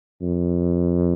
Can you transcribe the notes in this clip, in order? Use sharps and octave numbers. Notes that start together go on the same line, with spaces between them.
F2